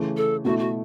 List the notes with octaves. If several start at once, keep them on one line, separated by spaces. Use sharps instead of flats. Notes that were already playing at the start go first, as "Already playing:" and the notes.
Already playing: C#3 E3 A3
A4
B2 A3 E4 F#4
F#4